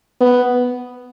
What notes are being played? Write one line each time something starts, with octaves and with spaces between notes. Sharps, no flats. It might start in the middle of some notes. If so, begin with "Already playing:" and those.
B3